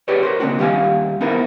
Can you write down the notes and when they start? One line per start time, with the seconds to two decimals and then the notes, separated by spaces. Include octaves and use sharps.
0.08 G4 G#4 B4 C#5 D5
0.23 A#4 C5
0.40 C#3 A#3 C4 D4 F#4
0.59 D#2 G3 G4 C#5 F5 G#5
1.21 B3 D#4 E4 A#4 C5